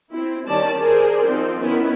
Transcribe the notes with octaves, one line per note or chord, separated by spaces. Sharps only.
C4 E4
D#3 G3 C#4 D5 A5
G#4 A#4 C5 D5
F3 C4 D#4
D#3 B3 C#4 E4 A#4